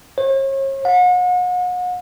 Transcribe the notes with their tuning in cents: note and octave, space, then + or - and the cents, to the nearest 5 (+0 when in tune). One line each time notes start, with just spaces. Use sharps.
C#5 -40
F#5 -40